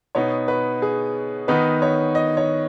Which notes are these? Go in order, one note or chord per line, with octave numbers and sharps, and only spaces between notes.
B2 B3 D#4 C#5
B4
G#4
D#3 B3 D#4 B4
C#5
D#5
C#5